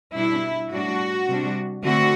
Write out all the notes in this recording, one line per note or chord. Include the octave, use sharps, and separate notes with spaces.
B2 G3 D4 E4
A2 G3 D4 F#4
C3 G3 D4
D3 A3 C4 F#4